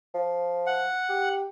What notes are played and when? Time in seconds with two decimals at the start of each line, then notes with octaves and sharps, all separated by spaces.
0.14 F3
0.67 F#5
1.09 G4